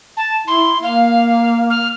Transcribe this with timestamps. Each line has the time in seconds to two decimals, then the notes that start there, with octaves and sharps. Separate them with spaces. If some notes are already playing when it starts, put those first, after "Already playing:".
0.17 A5
0.47 E4 C6
0.83 A#3 F5
1.70 F6